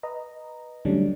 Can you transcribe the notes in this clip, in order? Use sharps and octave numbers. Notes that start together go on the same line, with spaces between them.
B4 D#5 A#5
D3 F#3 G3 A3 C#4 D4